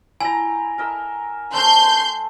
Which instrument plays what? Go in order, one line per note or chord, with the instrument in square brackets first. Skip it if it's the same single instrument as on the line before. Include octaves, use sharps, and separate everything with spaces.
[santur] E4 G5 A#5 [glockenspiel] G#5
[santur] A#4 D#5 E5
[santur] A3 A4 C5 [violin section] C6 G6